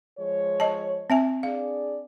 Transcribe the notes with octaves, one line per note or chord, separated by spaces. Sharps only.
F3 G#3 C#5
D#5 A5
C4 E5 G#5
D4 G#4 D5 F5